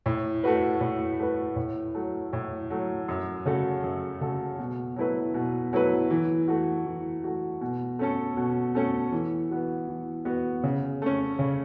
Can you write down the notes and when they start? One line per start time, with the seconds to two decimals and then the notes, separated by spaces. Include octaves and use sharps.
0.06 A2
0.44 A3 F#4 B4
0.81 A2
1.20 A3 F#4 B4
1.56 A2
1.95 F#3 A3
2.33 A2
2.70 F#3 A3
3.08 F#2
3.45 C#3 A3 F#4 A4
3.84 F#2
4.21 C#3 A3 F#4 A4
4.59 B2
4.96 F#3 A3 E4 B4
5.34 B2
5.73 F#3 A3 E4 B4
6.11 E3
6.48 A3 F#4
6.86 E3
7.24 A3 F#4
7.61 B2
7.99 A3 C#4 A4
8.37 B2
8.75 A3 C#4 A4
9.12 E3
9.51 B3 F#4
9.88 E3
10.25 B3 F#4
10.63 C#3
11.02 A3 C#4
11.39 C#3